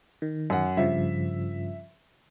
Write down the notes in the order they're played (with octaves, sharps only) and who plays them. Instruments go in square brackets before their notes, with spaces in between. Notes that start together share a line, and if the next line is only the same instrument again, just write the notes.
[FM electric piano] D#3
[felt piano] F#2 F#5
[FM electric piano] G2 C#3 F3 [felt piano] E5